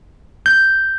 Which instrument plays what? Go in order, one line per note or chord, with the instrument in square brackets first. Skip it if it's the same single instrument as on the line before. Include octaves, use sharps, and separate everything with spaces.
[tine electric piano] G6